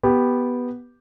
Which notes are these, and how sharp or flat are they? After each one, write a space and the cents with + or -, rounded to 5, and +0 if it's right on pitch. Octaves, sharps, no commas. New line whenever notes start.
B3 -5 G4 +0